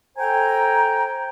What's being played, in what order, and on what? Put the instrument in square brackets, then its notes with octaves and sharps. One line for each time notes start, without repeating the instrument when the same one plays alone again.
[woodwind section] A4 C5 G5 G#5 A#5